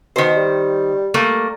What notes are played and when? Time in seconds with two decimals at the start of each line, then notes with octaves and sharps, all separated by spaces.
0.16 B2 D#3 C5
0.36 G3
1.14 G3 A3 A#3